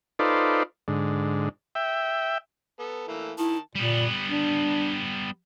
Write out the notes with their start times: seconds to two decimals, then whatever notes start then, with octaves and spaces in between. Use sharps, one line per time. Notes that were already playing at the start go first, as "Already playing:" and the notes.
0.19 D#4 F4 A4 B4 C5 D5
0.88 G#2 D3
1.75 E5 G5
2.80 B3 A4
3.08 E3 A3 A#3
3.38 D#3 E4 A5
3.75 A#2 G3 B3
4.28 D4